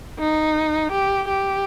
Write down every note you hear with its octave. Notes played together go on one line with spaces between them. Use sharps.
D#4
G4
G4